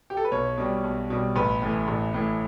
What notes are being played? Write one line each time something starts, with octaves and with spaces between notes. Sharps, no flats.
G4
A4
B4
B1 C#5
B2 G3
B1
B2 G3
A1 B4
A2 E3
A1
A2 E3